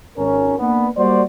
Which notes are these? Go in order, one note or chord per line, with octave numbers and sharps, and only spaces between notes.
G#1 C#4 A#4
A#3 B3 D4
G3 A#3 F#4 C5 D5